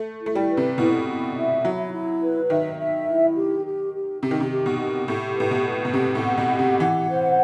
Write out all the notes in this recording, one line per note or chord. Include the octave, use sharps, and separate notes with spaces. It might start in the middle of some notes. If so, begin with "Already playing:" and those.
Already playing: A3
E4
A3
G3
B4
C3
B2 E4
E4
E5
F#3 E4
E4
B4
D#3 E5
E5
E4
G4
G4
G4
C3 G4
D#3
C3
G4
B2
G4
A2 G4
A2 B4
B2
B4
B2
C3 G4
A2
F#5
B2
G4
C3
E3 F#5
C5